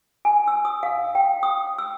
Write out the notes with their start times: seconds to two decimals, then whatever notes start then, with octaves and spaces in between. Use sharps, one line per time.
0.25 G#5
0.48 E6
0.65 D#6
0.83 F5
1.15 G5
1.43 D#6
1.78 E6